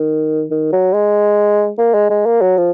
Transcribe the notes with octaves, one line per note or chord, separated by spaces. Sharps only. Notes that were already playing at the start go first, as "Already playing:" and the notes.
Already playing: D#3
D#3
F#3
G#3
A#3
G#3
G#3
A#3
F#3
F3